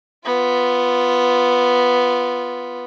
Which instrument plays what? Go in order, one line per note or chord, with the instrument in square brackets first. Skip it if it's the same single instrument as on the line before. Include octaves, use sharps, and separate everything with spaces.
[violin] B3 F4